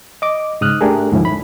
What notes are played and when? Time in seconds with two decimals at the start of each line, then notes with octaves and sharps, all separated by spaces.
0.22 D#5 D6
0.61 G#2 C#3 D#6 F6 F#6
0.81 A3 D4 G4 G#4 A#4
1.12 D2 G#2 D#3 F3 C#4 E4
1.25 B5